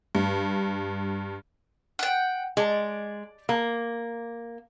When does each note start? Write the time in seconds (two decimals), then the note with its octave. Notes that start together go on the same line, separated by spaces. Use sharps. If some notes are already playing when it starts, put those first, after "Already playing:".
0.15 G2
1.99 F#5 G5
2.57 G#3 D5
3.49 A#3